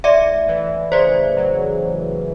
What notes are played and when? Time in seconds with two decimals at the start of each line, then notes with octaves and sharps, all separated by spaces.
0.04 A2 D5 E5
0.48 E3
0.92 C#3 C5 D5
1.37 F#3